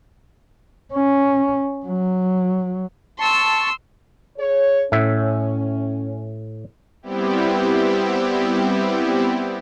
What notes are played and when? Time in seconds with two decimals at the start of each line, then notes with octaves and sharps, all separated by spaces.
0.94 C#4
1.86 F#3
3.19 A5 C6 C#6 E6
4.38 G#4 C#5
4.92 A2 C#4 E5
7.03 G3 B3 C4 E4 G4